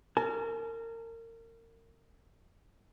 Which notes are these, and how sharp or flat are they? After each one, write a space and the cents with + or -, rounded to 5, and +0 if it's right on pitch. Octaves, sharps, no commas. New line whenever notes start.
A#4 -30 A5 -45